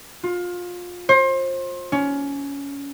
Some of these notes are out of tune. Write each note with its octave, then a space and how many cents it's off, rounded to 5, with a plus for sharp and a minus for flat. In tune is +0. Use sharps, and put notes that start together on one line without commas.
F4 +25
C5 +30
C#4 +20